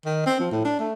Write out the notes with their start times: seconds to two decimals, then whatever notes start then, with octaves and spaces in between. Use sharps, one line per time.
0.05 D#3
0.26 C4
0.40 F3
0.52 A2
0.65 D4
0.79 A3